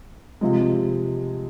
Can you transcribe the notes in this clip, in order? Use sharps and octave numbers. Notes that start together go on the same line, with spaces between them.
C3 F3 G#3